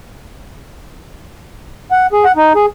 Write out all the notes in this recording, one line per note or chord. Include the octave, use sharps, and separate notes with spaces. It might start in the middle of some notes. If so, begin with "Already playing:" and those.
F#5
G#4
F#5
D#4
G#4